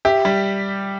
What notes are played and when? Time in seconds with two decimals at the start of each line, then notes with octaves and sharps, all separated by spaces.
0.05 G4 E5
0.25 G3